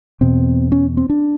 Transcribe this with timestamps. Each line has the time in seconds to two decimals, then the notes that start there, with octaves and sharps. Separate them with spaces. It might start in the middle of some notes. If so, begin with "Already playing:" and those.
0.21 E2 B2 C4
0.72 C#4
0.97 C4
1.09 D4